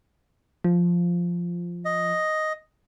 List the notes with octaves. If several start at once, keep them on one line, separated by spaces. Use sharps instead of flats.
F3
D#5